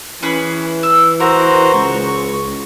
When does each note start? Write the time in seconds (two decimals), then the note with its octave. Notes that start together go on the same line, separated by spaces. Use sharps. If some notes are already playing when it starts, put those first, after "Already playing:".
0.22 E3 C#4 G#4 B4
0.83 E6
1.20 F#4 A#4 C5 A#5
1.74 C#2 C#6